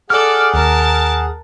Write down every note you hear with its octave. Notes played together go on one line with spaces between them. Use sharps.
G#4 A4 D5 F#5 F6
D#2 A#4 A5